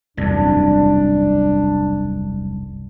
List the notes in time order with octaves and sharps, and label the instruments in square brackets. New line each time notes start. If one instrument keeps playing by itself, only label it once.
[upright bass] E1 [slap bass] C2 F#2 [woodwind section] D4